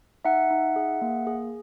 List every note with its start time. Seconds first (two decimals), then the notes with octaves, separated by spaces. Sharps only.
0.25 D#4 E5 F#5
0.50 D#4
0.76 G#4
1.01 A#3
1.27 G#4